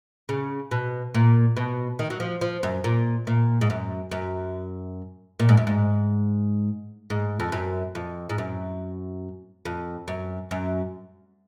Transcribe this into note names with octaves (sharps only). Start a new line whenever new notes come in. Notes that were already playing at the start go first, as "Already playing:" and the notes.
C#3
B2
A#2
B2
D#3
F#3
F3
F3
F#2
A#2
A#2
G#2
F#2
F#2
A#2
G#2
F#2
G#2
G#2
F2
F#2
F2
G#2
F#2
F2
F#2
F#2